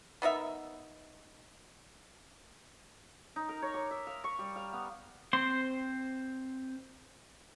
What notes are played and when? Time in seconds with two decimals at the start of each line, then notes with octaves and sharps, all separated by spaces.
0.22 B3 D#4 A#4 E5
3.36 D#4
3.49 A#4
3.62 C#5
3.74 D6
3.91 E5
4.07 F5
4.24 C#6
4.39 G3
4.56 F5
4.73 B3
5.33 C4 C5 C6